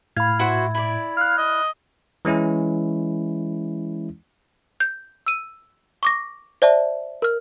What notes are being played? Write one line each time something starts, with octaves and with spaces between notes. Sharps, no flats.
A2 F5 B5 G#6
E4 F#4 C5
E4 D5
F5 F6 F#6
D#5
E3 G#3 C#4 E4
G6
E6 D#7
C#6 D6 A#6
C5 D5 E5 A5
A#4 F6